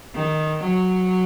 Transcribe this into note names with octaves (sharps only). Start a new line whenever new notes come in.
D#3
F#3